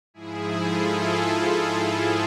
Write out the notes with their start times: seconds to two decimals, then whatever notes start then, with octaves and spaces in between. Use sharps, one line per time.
0.14 G#2 F3 E4 G#4
0.60 F4 A4